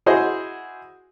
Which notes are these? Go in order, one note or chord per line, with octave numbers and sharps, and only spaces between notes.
E4 F#4 G#4 C5 D#5